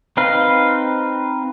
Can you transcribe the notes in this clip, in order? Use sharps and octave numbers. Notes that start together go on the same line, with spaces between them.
C4 D#4 B4 F5